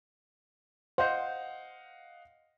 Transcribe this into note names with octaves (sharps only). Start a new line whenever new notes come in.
C5 D#5 F5 F#5